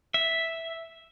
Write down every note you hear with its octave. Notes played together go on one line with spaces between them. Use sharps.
E5